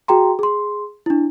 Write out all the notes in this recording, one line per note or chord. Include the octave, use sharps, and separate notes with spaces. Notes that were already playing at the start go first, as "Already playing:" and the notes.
F#4 G#4 G5 A#5 C6
G#4 C6
D4 E4